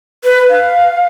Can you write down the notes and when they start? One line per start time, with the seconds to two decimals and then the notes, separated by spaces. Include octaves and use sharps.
0.24 B4
0.49 F5